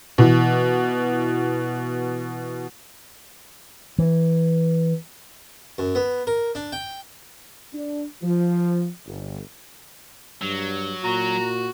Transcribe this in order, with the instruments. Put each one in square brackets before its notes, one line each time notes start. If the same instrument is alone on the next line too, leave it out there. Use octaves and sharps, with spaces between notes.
[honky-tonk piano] B2 E3
[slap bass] E3
[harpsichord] F#2
B3
A#4
D4
G5
[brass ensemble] D4
F3
G1
[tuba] G2 [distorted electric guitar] F#3
[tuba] A#2 [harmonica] F#4 [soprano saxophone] A#5